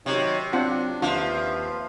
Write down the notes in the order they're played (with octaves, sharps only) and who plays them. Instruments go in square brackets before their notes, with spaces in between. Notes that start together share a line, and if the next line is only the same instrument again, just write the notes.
[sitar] C3 [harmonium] D#3 F#3 D#4 [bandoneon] C#5
[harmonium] F#3 [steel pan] C4 F4 F#5 [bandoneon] D4
[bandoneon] D#2 [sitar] F3 [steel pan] D4 F4 [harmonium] B4 E5 F5